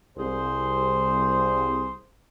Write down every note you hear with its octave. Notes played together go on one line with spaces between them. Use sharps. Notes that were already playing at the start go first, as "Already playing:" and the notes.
C2 G#4 C5